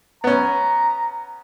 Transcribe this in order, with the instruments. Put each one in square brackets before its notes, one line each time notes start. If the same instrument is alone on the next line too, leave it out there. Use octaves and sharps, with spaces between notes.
[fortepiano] B3 C#4 [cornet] A#5